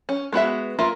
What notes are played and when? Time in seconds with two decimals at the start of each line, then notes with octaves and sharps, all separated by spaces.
0.09 C#4
0.32 G#3 B3 F#4 E5
0.79 A#3 F4 E5